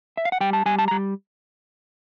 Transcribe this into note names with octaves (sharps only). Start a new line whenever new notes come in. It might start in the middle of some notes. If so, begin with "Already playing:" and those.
E5
F5
F#5
G3 G5
A5
G3 G#5
A5
A#5
G3